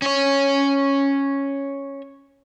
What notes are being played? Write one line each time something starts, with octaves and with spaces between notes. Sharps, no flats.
C#4 C#5